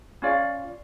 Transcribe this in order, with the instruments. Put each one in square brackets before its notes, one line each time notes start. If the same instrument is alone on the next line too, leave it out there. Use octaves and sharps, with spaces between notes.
[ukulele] C#4 F4 D5 F5